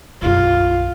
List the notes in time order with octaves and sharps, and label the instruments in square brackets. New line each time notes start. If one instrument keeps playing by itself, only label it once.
[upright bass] B1 F#2 [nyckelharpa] F4